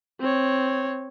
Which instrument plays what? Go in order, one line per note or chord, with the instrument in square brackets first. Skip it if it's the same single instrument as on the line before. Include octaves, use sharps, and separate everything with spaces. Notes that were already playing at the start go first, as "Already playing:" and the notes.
[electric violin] C4 C#5